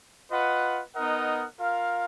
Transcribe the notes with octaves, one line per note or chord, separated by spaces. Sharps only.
F4 B4 D#5 F#5
B3 D#4 A#4 D#5 F#5
F4 A#4 F5